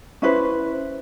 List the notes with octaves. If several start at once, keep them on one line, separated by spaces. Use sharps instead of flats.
C#4 E4 B4 C5